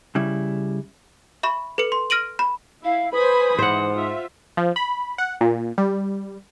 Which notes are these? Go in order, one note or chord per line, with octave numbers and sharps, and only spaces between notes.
C#3 G3 E4
E5 B5 C#6
A4 B4 C#7
C6
F6 A#6 D7 D#7 F#7
B5
E4 F5
B4 C5 G#5 B5 D#6
G#2 E3 C5 F#5
F4 E5
F3
B5
F#5
A#2
G3